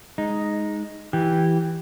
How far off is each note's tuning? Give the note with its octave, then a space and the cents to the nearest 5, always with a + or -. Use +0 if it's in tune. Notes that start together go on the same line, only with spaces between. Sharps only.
G#3 +0 D#4 +0
E3 +0 G4 +0